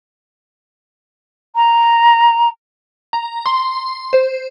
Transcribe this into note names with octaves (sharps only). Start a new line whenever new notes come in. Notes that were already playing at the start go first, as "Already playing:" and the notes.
A#5
A#5
C6
C5